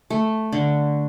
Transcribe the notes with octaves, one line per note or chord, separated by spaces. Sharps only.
A3
D3